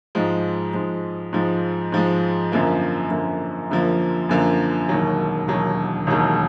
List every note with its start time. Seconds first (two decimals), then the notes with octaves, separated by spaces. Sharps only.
0.15 G#2 F3 G#3
0.73 G#2 F3 G#3
1.33 G#2 F3 G#3
1.92 G#2 F3 G#3
2.52 F#2 D3 F3 A#3
3.10 F#2 D3 F3 A#3
3.70 F#2 D3 F3 A#3
4.29 F#2 D3 F3 A#3
4.89 E1 D#2 D#3 F#3
5.48 E1 D#2 D#3 F#3
6.07 E1 D#2 D#3 F#3